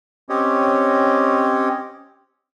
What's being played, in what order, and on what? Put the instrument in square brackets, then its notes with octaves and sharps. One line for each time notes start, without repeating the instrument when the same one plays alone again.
[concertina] C4 C#4 G4 C#5 D#5